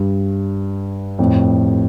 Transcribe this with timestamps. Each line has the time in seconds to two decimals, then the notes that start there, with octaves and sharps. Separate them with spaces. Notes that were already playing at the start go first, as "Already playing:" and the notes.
Already playing: G2
1.19 F2 A2